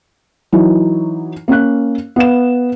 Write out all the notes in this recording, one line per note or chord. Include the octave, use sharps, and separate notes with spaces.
E3 F#3 D#4
A#3 C#4 F5 F#6
B3 F5 E7